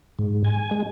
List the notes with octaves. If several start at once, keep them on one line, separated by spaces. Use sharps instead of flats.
G#2
G#5
G#3